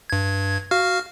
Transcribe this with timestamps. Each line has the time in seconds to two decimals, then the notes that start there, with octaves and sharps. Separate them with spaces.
0.10 G2 G#6
0.71 F#4 F5 F6